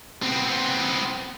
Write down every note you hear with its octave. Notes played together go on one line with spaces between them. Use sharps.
B3 C4